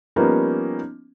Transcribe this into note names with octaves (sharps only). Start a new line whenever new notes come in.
F3 G3 A#3 B3 C#4 D#4